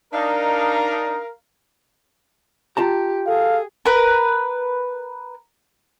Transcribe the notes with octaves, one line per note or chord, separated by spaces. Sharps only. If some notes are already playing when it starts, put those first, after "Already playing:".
D4 D#4 A#4 F5 A#5
F4 G4 A5 A#5
G#4 A4 F5
A#4 B4